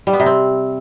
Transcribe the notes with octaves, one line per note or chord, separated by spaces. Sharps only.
G3
B3
C3
C4